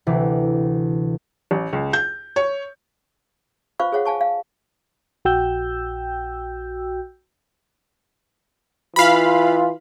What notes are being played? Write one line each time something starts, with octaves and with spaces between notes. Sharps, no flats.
D2 C3 E3
A1
C#2
G6
C#5
F4 B4 C5 F5 C#6
G#4 C5 C#5 F5 F#5
F5 G#5 A5 C#6
F5
A#1 F#4 G5 E6 G6
E3 F4 F5 B5